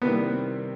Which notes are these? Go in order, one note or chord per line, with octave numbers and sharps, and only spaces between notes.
C3 D#3 G3 B3 C4 E4